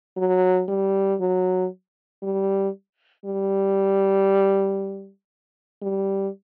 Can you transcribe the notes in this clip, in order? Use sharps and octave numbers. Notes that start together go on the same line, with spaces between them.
F#3
G3
F#3
G3
G3
G3